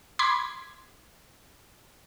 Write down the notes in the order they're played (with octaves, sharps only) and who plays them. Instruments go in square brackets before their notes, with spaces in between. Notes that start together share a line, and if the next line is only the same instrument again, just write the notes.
[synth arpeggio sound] B5 C6 D6 G#6 B6 C7